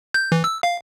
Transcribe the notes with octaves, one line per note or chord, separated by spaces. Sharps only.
G6
E3
E6
F5